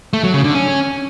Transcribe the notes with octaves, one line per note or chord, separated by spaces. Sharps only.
A3
F#3
C#3
D3
C#4